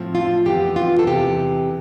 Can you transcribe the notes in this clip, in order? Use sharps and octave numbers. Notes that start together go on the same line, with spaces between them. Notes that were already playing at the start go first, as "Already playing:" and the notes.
Already playing: A2 F3 C4 E4
F4
F2 E3 B3 G4
F4
A4
E2 C3 E3 G4